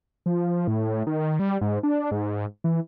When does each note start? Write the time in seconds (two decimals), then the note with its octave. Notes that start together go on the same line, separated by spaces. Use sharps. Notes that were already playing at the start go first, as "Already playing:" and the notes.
0.26 F3
0.68 A2
1.07 D#3
1.39 G3
1.61 G#2
1.83 D4
2.11 G#2
2.64 E3